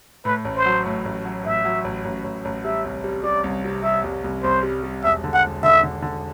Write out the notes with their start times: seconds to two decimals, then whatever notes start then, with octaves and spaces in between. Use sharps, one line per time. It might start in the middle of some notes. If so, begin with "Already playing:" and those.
0.25 A2 B4
0.45 A1
0.56 C5
0.66 F#3
0.86 A2
1.06 A1
1.25 F#3
1.44 A1 E5
1.65 F#3
1.84 A1
2.05 A1
2.24 A1
2.45 A1
2.65 G3 E5
2.85 C2
3.04 G3
3.23 G3 D5
3.44 C2
3.64 C3
3.83 G3 E5
4.04 C2
4.24 C2
4.43 C2 C5
4.63 G3
4.83 G3
5.03 E1 E5
5.24 D3
5.34 F#5
5.43 E1
5.63 D3 E5
5.83 D3
6.02 D3